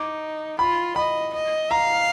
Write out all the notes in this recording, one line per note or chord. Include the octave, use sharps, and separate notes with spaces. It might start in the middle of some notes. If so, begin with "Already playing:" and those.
Already playing: D#4 D6
F4 B5
D#5 B5
D#5
F5 A#5